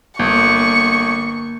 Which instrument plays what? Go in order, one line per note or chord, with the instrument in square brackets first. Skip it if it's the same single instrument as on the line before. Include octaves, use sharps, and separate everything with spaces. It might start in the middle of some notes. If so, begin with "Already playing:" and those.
[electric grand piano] G1 [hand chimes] A#3 [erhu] C#6